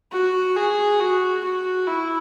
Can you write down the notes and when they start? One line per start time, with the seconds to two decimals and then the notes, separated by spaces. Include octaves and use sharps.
0.13 F#4
0.56 G#4
1.00 F#4
1.44 F#4
1.87 E4